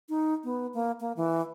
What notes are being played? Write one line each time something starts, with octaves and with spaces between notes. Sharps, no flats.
D#4
B3
A#3
A#3
E3